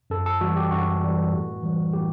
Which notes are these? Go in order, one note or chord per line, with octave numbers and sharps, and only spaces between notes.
F#2 A4
A4
E3 G3 F#4
G4
F#2 F#4
E3 G3
A2
E3 G3
A2 G4